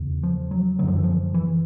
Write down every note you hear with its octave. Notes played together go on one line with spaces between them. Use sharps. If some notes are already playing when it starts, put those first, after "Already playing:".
Already playing: E2 C#3
F3
F#3
F#2 D3 F3 F#3
E3
F3
E3